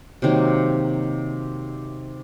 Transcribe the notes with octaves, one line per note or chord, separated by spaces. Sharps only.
C3 D#3 F#3 A#3